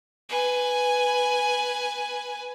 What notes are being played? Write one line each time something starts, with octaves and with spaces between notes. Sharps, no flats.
B4 G#5